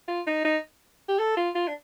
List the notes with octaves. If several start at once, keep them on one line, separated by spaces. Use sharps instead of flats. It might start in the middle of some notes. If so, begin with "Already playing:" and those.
F4
D#4
D#4
G4
A4
F4
F4
D4